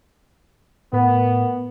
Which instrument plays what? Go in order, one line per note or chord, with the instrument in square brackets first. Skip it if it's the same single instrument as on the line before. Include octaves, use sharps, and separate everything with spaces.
[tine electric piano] A2 A#4 [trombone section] B3